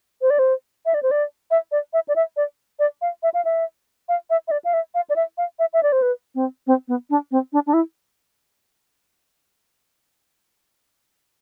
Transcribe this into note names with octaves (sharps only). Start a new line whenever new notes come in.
C5
D5
C5
E5
D5
C5
D5
E5
D5
E5
D5
E5
D5
D5
F5
E5
F5
E5
F5
E5
E5
D5
F5
E5
F5
D5
E5
F5
E5
E5
D5
C5
B4
C4
C4
B3
D4
C4
D4
D4
E4